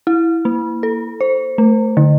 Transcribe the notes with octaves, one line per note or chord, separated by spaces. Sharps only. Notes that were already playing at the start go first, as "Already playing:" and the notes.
E4
A#3
A4
C5
A3
D3